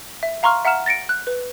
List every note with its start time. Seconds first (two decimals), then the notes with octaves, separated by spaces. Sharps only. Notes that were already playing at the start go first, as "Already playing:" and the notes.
0.23 E5
0.43 F5 A#5 C6 C#6 F6
0.65 E5 F#5 A#5 F6 E7
0.86 A6 A#6 C#7 D7
1.09 F#6
1.27 B4